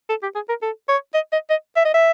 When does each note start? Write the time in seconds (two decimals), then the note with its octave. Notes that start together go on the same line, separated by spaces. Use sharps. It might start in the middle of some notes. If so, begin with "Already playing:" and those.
0.10 A4
0.23 G4
0.35 G#4
0.49 A#4
0.62 A4
0.89 C#5
1.14 D#5
1.32 D#5
1.50 D#5
1.76 E5
1.85 D#5
1.94 E5